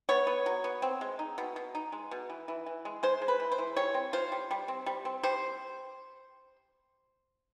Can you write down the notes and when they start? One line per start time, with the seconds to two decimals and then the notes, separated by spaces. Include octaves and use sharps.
0.09 B3 C#5
0.27 B3
0.46 F#3
0.64 B3
0.82 C4
1.01 G#3
1.19 D#4
1.38 B2
1.56 B2
1.75 D#4
1.92 G#3
2.11 B2
2.30 E3
2.48 E3
2.66 E3
2.85 G#3
3.03 G#3 C5
3.22 G#3
3.28 B4
3.40 E3
3.52 C5
3.58 E3
3.76 G3 C#5
3.94 C4
4.13 F4 C5
4.32 G3
4.51 G3
4.68 C4
4.86 G3
5.05 C4
5.23 G3 C5